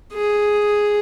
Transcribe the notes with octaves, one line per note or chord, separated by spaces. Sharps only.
G#4